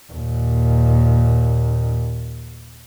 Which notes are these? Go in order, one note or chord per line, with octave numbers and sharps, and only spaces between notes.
D#2 A#2